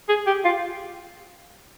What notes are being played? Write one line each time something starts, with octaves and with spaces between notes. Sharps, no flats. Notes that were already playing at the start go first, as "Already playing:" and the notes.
G#4
G4
F4